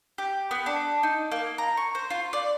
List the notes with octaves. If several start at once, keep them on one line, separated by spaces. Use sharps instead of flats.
G4
B3
D4
D#4
A#3
A#5
C#6
C5
F4
D5